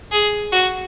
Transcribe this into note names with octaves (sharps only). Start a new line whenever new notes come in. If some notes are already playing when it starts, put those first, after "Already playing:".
G#4
F#4